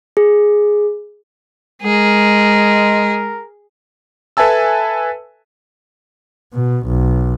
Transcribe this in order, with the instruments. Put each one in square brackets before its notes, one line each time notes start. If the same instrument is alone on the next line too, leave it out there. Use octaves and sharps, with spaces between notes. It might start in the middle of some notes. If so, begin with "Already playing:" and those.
[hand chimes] G#4
[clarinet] G#3 [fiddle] G#4 [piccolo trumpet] A#4
[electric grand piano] A4 B4 E5 G#5 A5 E6
[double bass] B2
B1